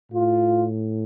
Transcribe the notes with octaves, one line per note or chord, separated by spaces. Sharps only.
A2 F4